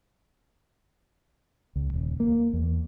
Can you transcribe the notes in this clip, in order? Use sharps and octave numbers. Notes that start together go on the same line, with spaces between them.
C#2
D#1
A#3
E2